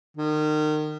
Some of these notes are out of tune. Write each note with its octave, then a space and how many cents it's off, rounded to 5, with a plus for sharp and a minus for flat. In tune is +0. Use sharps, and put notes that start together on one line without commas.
D#3 -30